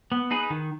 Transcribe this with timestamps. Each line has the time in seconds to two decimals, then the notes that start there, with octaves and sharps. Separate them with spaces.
0.12 B3
0.31 D#4 G#4 B4
0.50 D#3